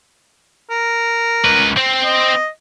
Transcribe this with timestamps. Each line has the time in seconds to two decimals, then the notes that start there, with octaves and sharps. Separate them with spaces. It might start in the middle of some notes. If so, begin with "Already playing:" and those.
0.70 A#4
1.45 C#2 B4
1.77 C4
2.04 D#5